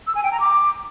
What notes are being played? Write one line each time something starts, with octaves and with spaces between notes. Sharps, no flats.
E6
G#5
G5
A#5
D6